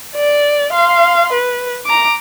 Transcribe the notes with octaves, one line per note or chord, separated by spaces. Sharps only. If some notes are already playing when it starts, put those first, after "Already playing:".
D5
F5 C6
B4
A#5 D6